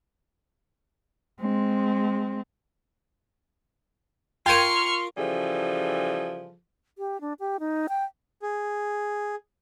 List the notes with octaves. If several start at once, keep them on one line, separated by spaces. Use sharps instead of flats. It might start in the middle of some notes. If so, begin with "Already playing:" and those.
G#3 C4
F4 A#4 G5 C6 C#6 F6 G#6 D#7
C#3 E3 F3 G3 G#4 A4
G4
D4
G4
D#4
G5
G#4